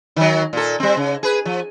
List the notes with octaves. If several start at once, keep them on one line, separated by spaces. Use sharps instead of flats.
D#3 F#3
A#2 A4
G3 C4
C#3
G#4 B4
F3